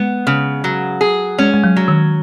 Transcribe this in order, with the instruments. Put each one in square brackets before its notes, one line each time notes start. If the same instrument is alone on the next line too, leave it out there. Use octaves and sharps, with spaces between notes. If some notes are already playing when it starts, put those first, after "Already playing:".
Already playing: [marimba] G#3 [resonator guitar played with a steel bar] B3
[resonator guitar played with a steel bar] C#3
F#3
G#4
[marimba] G#3 [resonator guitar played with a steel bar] C#4
[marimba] G#3
F#3
[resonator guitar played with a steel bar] F#3
[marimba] D#3